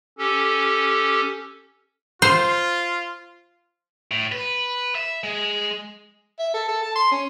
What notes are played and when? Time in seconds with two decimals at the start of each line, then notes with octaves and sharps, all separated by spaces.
0.18 C#4 G4 A4
2.22 F4 C5
4.11 A2
4.32 B4
4.95 E5
5.24 G#3
6.39 E5
6.54 A4
6.68 A4
6.83 A5
6.96 C6
7.12 C#4